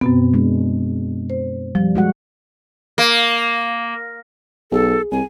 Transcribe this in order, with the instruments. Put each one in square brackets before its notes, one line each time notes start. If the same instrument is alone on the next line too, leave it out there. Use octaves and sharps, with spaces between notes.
[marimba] F#2 B2 B3 [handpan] C4
[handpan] G#3 D4
[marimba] C5
[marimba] F3 [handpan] G3
[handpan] G#3 F#4 F#5
[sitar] A#3
[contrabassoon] B1 [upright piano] G#4 [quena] A4
[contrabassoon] C2 [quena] G#5